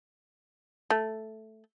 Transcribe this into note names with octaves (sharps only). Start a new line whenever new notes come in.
A3